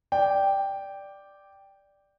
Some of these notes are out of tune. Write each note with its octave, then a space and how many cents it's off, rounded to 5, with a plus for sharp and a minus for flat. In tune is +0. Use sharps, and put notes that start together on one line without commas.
D5 +0 G5 +0